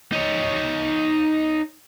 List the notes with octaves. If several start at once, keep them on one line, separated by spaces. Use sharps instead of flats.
D#4 C#5